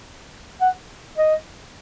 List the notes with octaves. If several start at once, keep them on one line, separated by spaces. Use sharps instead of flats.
F#5
D#5